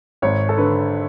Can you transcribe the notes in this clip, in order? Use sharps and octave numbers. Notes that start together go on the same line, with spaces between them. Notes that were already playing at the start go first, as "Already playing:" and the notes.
G#1 C#5
A4
D3 B4